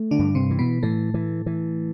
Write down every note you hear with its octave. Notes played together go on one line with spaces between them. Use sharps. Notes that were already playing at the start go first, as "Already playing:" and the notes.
Already playing: A3
D3 D4
G2
C3 C4
E3
B2 B3
A2 E3 A3
E3
E3